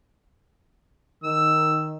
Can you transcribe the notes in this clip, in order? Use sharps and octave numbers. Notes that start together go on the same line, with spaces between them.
D#3 E6